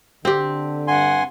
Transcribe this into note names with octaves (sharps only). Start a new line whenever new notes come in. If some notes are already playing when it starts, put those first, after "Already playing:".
D3 C4 G4
G2 F#5 G#5 C6